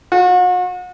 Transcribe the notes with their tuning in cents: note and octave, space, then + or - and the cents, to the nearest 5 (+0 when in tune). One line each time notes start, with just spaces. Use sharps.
F#4 -40